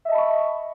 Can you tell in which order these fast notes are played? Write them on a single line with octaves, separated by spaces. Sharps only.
E5 D#5 A5 B5 C#6